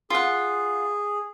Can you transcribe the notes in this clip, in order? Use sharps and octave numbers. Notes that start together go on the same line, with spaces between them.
F4 G#4 F#5